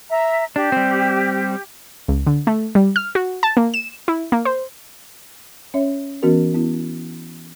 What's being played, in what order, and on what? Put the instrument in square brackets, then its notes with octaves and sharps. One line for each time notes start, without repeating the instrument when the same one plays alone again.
[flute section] E5 A#5
[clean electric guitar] D4 [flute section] G4
[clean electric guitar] G3 C4
[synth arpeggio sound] C#2
D3
A3
G3
F6
F#4
A5
A#3
E7
E4
A#3
C5
[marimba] C#4 C#5 E5
E3 B3 C#4 F#4 A#4
B3 E4